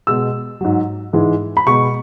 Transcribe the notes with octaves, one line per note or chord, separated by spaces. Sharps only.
B2 G#3 E6
G#2 F#3
G#2 E3 G#3
B5
B2 G#3 C#6